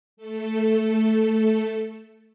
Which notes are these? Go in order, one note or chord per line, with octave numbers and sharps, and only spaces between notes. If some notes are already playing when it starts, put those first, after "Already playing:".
A3 A4